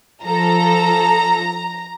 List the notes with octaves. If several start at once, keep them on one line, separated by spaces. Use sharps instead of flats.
F3 A4 A#5